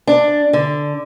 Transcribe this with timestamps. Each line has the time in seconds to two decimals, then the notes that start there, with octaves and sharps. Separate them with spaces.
0.07 D4
0.53 D3